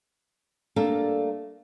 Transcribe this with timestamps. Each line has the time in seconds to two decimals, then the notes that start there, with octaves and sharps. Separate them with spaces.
0.76 G3 A3 A#3 D4 A4 A#4